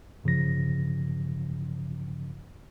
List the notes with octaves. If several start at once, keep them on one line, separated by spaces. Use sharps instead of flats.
G2 C#3 F3 A#6